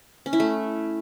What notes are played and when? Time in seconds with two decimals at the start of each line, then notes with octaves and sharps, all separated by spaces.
0.26 C#4
0.33 E4
0.40 A3